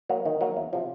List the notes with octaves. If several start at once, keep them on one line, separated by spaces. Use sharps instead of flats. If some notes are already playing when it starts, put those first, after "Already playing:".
F#3 A#3
D#3
F#3 A#3
E2
C3 F3